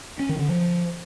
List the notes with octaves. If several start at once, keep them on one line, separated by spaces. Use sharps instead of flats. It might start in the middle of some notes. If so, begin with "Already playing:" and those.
C#4
D#3
D3
F3